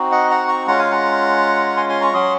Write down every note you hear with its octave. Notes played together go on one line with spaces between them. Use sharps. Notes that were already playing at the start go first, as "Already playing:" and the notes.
Already playing: C4 D#4 F#4
D#5 F#5
F#5 A#5
A#5 C#6
G#3 C#4 F4 F#5 A#5
F5 G#5
F#5 A#5
G#5 C6
G#5 C6
A#5 C#6
F#3 C#4 F#4 C6 D#6